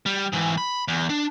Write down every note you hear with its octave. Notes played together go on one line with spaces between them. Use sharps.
G3
G#2 E3
B5
E2
D4